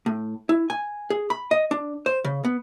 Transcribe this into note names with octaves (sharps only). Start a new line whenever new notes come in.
A2
E4
G#5
G#4
B5
D#5
D4
C5
C#3
B3